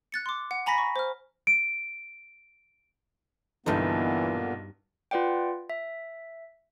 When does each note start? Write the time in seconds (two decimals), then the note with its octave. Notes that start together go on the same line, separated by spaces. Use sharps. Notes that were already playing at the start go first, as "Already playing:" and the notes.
0.12 F#6 A6 C#7
0.26 C6 D6
0.51 F#5
0.66 G#5 A#5 B5 A#6 B6
0.78 C#6
0.96 C5 F6
1.47 D7
3.66 B1 G2 A#2 D3 E3 A#3 B3 D#4
5.11 F4 B4 D5 F#5 G5
5.70 E5